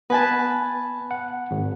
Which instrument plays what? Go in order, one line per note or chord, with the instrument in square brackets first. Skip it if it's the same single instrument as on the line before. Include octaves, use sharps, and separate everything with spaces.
[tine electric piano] B3 [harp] B4 G#5 A5
[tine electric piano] F#5
G#1